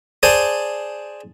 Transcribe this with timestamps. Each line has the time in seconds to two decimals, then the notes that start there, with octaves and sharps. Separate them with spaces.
0.23 G#4 C5 D5 G#5 A5